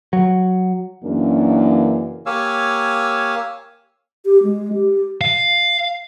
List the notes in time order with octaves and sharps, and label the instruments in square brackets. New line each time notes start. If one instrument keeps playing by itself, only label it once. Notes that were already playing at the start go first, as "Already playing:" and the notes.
[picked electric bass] F#3
[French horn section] F#2 C#3 E3 A#3 D4
[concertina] A#3 G4 C#5 F5 G#5 E6
[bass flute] G4
G#3
G4
[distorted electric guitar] F5